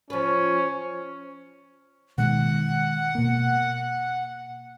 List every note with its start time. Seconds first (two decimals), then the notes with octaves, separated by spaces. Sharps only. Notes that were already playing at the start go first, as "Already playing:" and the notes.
0.10 F3 C#4 B4
2.18 B2 D#3 G#3 F#5
3.15 B2 A#3